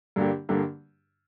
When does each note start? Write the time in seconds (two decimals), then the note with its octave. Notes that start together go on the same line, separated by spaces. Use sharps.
0.16 G2 D3 A#3 D4 G4
0.49 G2 D3 A#3 D4 G4